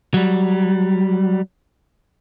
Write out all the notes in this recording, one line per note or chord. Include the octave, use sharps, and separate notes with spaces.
F#3 G3